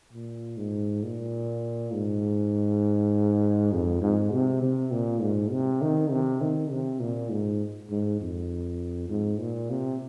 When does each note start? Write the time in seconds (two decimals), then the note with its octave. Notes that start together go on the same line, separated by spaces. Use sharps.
0.13 A#2
0.57 G#2
1.03 A#2
1.93 G#2
3.72 F2
4.02 G#2
4.32 C3
4.62 C3
4.91 A#2
5.21 G#2
5.51 C3
5.82 D#3
6.10 C3
6.41 D#3
6.71 C3
7.00 A#2
7.31 G#2
7.90 G#2
8.20 F2
9.09 G#2
9.39 A#2
9.70 C3